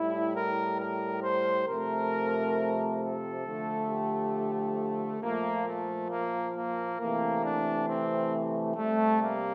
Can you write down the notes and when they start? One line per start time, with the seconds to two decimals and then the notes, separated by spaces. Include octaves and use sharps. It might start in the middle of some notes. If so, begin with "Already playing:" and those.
Already playing: A2 G3 E4
0.34 A#4
0.78 A#4
1.22 C5
1.67 C3 F3 A3 A#4
3.00 A4
3.44 D3 F3 A3
3.89 G4
5.22 A#2 F3 A3 A#3
5.66 A3
6.10 A#3
6.55 A#3
6.99 C3 E3 A3 A#3
7.43 D4
7.88 C4
8.76 C3 G3 A3
9.21 A#3